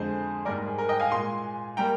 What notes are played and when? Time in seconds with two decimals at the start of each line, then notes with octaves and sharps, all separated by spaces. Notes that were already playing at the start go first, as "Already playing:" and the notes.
Already playing: F2 D3 G#3 G#4 C5
0.45 G#2 G3 A#3 A#4 D5
0.67 G#4
0.78 A#4
0.89 D#5 G5
1.00 F5 G#5
1.11 A#2 G#3 G#5 C6
1.77 G3 A#3 G5 A#5